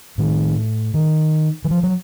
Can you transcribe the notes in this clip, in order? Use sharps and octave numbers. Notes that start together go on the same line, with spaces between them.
A2 D#3
D#3
E3
F3
F#3